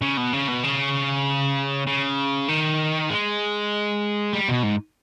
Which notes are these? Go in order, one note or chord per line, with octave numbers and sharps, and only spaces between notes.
C#3
B2
C#3
B2
C#3
C#3
D#3
G#3
G3
B2
G#2